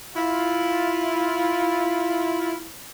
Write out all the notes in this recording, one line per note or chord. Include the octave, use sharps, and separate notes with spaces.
E4 F4